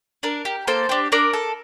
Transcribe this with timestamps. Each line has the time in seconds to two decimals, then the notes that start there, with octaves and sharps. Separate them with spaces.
0.23 D4 A#4
0.45 G4
0.67 A#3 A4 C5
0.89 D4 G4
1.12 D4 A#4 D5
1.33 A4